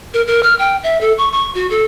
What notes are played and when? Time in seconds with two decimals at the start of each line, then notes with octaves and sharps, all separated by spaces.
0.14 A#4
0.27 A#4
0.43 F6
0.59 G5
0.84 E5
1.01 A4
1.18 C#6
1.32 C#6
1.55 F#4
1.70 A4